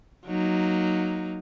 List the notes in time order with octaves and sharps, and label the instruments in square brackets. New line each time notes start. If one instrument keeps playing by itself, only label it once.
[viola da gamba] F#3 A#3 D#4